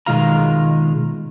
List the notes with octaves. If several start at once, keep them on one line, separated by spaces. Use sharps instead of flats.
B2 D#3 G#3 F4 F5 A#5